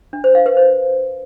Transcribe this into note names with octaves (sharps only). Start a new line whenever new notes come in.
D4
C5
F5
B4
C5